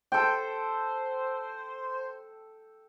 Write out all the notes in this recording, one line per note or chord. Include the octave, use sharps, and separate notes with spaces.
A4 C5 G5